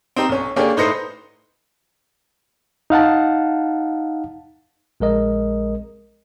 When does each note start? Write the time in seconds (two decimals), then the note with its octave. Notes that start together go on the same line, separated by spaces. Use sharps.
0.16 C4 D#4 G4 A#5
0.29 B1 C#4
0.56 D3 A#3 C#4 D4 G4 G#4
0.77 A2 D#4 B4 C5 A#6 C#7
2.90 D#4 F5 F#5 A5
5.00 A#1 G#3 A#4 D#5